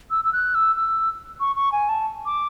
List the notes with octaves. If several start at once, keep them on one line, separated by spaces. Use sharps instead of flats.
E6
E6
F#6
E6
E6
C#6
C#6
G#5
A5
D6